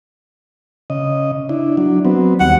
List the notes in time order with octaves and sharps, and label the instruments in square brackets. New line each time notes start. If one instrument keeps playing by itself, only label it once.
[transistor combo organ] C#3 D#5
D4 E4
F#3 D4
F#3 B3 C4
[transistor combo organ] D#2 G3 [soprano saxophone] F#5